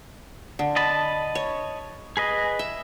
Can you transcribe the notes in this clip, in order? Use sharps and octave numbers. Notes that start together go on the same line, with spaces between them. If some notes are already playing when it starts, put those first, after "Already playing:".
D3
D#5 A5 B5
C#5
G#4 B4 D#5
E5